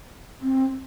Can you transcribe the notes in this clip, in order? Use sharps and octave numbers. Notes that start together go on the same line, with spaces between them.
C4